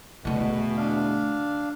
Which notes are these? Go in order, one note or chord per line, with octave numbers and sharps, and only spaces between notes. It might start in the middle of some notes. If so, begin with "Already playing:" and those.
E2 B2 D3 E3 A3
D4 F5